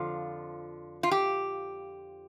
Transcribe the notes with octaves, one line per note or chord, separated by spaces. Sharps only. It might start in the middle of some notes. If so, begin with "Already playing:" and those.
Already playing: F2 D3 F3 F4
F4
G4